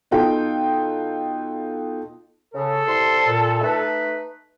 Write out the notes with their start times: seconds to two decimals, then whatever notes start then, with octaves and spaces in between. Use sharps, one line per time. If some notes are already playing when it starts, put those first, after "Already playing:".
0.11 B2 D#4 F4 A4 G5
2.54 C#3 A4
2.87 C2 C6
3.26 A#2
3.61 A3 D#4 B4